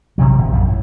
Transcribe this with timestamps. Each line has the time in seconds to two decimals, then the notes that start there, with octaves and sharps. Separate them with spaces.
0.18 A#1 C3 D#3 F#3
0.38 E1 A#2
0.52 A#1 F#2 G3
0.68 A2